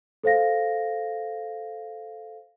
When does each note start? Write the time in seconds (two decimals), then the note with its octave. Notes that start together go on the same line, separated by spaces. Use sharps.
0.24 A4 C5 F5 A#6